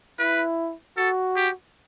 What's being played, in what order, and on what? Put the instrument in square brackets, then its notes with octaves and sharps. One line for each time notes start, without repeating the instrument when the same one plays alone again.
[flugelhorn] E4 [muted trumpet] B4
[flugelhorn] F#4 [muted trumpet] A4
[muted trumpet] G4